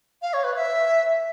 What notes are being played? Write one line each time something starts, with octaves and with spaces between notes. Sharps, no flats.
F5
C#5
B4
E5